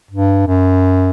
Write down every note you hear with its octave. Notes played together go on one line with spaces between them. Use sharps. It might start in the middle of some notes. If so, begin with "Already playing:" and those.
G2
F#2